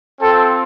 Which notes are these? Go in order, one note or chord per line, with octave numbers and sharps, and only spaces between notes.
C4 F4 A4